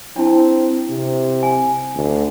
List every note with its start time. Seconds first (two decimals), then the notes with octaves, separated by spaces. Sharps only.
0.16 C4 D4 E4 A5
0.90 C3
1.43 G#5
1.95 D2